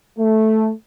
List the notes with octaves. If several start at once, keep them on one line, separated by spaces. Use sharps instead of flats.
A3